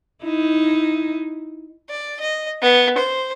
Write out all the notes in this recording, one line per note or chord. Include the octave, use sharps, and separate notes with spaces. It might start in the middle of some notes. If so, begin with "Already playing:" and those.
D#4 E4
D5
D#5
B3
C5